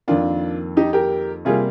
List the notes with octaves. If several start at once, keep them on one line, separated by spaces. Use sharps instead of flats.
F2 D#3 A#3 D4 F4
D#4 G4
G4 A#4
C3 G3 A#3 F4 G#4